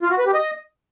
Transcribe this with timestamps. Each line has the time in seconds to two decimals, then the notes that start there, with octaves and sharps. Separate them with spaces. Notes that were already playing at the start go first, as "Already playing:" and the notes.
0.03 F4
0.10 F#4
0.18 B4
0.26 G4
0.34 D#5